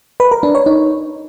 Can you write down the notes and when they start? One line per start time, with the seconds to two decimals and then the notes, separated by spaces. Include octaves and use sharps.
0.20 B4
0.31 A#4
0.43 D4
0.55 C#5
0.66 D#4